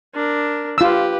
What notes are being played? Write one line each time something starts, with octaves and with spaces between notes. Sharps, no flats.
D4 A#4
F4 G4 B4 E6